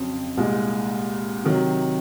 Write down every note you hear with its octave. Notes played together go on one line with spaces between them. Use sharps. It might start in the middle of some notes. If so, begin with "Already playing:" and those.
Already playing: F2 C#3 F#3 C4
C2 A#2 G#3
C3 D#3 F#3